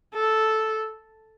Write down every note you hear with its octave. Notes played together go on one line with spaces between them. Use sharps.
A4